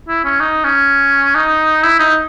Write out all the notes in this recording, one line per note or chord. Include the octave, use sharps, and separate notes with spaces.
E4
C#4
D#4
C#4
D#4
E4
D#4